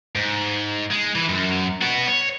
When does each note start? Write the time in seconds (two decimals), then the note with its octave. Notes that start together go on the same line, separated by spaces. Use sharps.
0.15 G#2
0.91 G#3
1.15 E3
1.29 F#2
1.82 B3 F#4
2.08 C#5